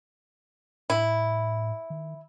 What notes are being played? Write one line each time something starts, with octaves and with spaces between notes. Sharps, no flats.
A2 E4
D#3